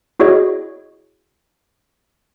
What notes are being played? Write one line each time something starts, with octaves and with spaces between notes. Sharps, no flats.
E4 F#4 G#4 C#5 D#5